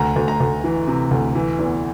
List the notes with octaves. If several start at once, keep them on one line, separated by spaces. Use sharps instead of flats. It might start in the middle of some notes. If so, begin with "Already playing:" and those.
Already playing: D2 A#5
D2
A#5
D2
E3
C3
D2
E3
E2